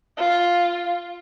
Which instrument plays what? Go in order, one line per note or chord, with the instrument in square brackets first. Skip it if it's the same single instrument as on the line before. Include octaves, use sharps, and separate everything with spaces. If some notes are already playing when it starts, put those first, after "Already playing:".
[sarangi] F4